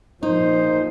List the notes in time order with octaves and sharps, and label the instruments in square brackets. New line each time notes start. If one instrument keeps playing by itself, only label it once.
[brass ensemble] A#1 A#2 C5 [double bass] F3 [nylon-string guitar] D#4